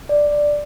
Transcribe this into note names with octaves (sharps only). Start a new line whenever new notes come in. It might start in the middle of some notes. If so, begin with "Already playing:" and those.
D5